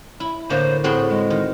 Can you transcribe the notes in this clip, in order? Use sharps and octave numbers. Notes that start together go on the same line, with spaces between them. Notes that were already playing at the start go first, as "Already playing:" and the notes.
E4
A2 D3 A#3 C5
A2 C4 F#4 G#4
G#3
D#3